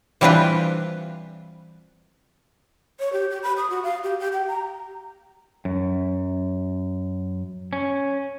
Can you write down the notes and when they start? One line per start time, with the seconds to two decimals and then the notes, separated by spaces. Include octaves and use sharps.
0.21 E3 G3 C4 D4 F4 B4
3.00 C#5
3.13 G4
3.30 G4
3.43 B5
3.57 D#6
3.70 F#4
3.83 F5
4.03 G4
4.19 G4
4.33 G5
4.48 A#5
5.65 F#2
7.73 C#4